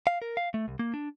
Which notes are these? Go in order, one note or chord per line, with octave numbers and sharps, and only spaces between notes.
F5
A#4
F5
A3
C2
A#3
D4